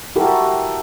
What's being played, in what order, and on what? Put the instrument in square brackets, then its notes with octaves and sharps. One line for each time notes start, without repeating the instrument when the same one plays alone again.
[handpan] E4 F#4 G4 A4 A#4